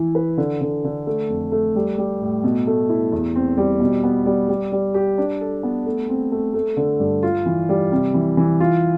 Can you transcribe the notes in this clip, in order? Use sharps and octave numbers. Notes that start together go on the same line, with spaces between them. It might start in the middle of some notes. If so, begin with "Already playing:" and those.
Already playing: E3 E4
B4
D3
D3
D3
A3
F2
A3
G3
G3
A2
B2
A3
E4
E2
C4
G3
B2
B3
G3
G3
G3
G4
D4
A4
B3
A3
C4
A3
A3
D3
G2
F4
E3
G3
C3
E3
E3
F4